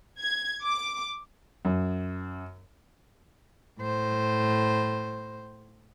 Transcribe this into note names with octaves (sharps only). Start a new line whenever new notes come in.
G#6
D6
F#2
A2 C5